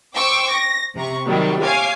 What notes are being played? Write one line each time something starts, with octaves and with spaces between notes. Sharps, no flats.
C5 G5 C#6 D6 E6
A#6
C3 A#5 C#6
C3 D#3 F#3 G3
C#5 F5 G#5 D6 C7